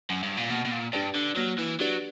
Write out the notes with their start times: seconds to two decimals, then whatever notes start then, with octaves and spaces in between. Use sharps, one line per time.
0.10 F#2
0.23 G2
0.37 A#2
0.50 B2 A#3
0.65 B2
0.72 A#2
0.93 G2 D4 G4 B4 D5
1.15 D3
1.37 F#3 A#3
1.59 E3
1.80 F#3 D4 G4 B4 D5